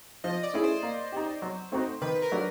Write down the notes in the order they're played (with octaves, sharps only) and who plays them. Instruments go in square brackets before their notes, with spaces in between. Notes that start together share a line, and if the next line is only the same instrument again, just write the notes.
[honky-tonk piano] F3 [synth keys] D#5
[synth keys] D5
[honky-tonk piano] A3 C#4 E4 G#4
[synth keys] C5
[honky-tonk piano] A#3
D#4 G4
F#3
A3 C4 D#4 F#4
[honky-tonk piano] D#3 [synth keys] B4
[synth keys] A#4
[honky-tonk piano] F#3 A3 D4 F#4